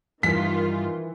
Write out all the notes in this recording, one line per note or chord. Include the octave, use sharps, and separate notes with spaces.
G2 D#3 E3 F4 B6